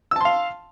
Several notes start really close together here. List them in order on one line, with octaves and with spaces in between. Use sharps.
E6 A5 C6 F5